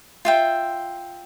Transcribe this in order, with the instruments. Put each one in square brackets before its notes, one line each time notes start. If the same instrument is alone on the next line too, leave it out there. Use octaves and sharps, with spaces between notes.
[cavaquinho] F4 E5 G5